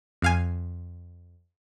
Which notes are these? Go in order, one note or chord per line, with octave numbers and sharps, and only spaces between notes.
F2 F5 G#5